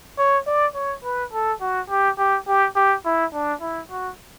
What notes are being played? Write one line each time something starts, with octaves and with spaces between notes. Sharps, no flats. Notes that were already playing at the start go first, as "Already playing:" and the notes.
C#5
D5
C#5
B4
A4
F#4
G4
G4
G4
G4
E4
D4
E4
F#4